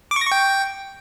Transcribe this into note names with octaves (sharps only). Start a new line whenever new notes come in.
D6
C#6
A#6
C#6
G5